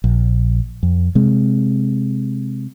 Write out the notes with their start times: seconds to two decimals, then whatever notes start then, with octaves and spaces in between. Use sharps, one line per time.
0.04 A#1
0.83 F2
1.15 C3 G#3